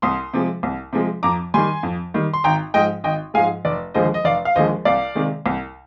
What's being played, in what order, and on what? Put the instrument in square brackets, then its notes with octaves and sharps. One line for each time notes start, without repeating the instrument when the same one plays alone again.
[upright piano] C2 C6 D#6
C3 F3 G#3
C2
C3 F3 G#3
F2 A#5 D6
D#3 G3 G#5 C6
F2
D#3 G3
C6
G#1 G5 A#5
G#2 F3 G#3 D#5 G5
G#1 D#5 G5
G#2 F3 G#3 F5 G#5
F1 D5
D#2 D3 F3 G#3 C5 D#5
D#5
F1 D5 F5
F5
D#2 D3 F3 G#3 C5 D#5
C2 D5 F5
C3 D#3 G#3
C2